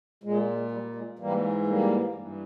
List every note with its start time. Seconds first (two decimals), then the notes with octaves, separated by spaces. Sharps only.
0.24 A#2 G#3
0.71 G3
0.95 G#3
1.19 G#2 E3 G3 A#3
1.67 G3 A#3
2.15 G2 E3